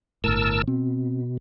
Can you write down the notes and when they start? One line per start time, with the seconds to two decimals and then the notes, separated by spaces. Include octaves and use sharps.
0.24 G1 A2 A#4 A5 E6
0.68 B2 C4